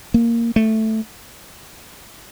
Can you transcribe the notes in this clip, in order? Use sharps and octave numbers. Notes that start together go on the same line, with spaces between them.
A#3
A3